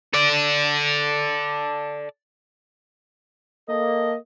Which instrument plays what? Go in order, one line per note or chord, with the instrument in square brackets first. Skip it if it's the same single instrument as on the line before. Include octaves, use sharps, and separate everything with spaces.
[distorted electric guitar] A4 D5
[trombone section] A#3 A4 [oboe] D#5